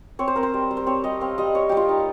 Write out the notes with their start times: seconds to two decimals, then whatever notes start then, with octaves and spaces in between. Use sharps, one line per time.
0.19 C4 C#5
0.28 C5
0.36 C4 A#4
0.43 C5
0.54 G3
0.71 G3
0.77 C5
0.87 C4 C#5
1.04 G3 D#5
1.21 C4 F5
1.38 G3 D#5
1.55 G3 C#5
1.69 G3 G4
1.77 F4
1.89 D#4